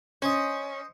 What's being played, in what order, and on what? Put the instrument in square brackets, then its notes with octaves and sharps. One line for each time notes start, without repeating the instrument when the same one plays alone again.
[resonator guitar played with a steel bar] C#4 [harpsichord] C5 D#5